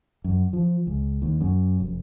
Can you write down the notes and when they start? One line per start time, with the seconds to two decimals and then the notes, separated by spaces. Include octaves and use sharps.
0.24 F#2
0.53 F3
0.87 C#2
1.22 D#2
1.41 F#2
1.80 F1